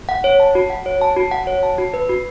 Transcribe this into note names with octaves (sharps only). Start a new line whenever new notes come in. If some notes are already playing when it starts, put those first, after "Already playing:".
F#5
C#5
A5
F#4
F#5
C#5
A5
F#4
F#5
C#5
A5
F#4
B4
F#4